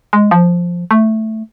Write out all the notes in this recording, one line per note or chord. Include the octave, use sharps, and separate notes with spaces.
G#3
F3
A3